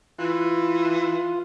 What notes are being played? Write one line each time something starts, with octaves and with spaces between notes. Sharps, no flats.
E3 F4